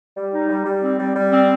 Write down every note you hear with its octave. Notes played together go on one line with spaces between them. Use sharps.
G3
D#4
G3
G3
C4
G3
G3
C4